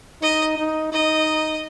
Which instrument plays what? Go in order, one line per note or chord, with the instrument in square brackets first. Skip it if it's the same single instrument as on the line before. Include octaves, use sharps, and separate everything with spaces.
[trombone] D#4 [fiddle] D#5
[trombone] D#4
[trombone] D#4 [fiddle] D#5